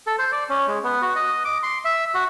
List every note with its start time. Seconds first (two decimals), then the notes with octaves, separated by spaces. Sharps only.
0.07 A4
0.18 C5
0.32 D5
0.49 C#4
0.67 G#3
0.84 B3
1.02 F#4
1.16 D#5
1.45 D6
1.63 C6
1.85 E5
2.14 F#4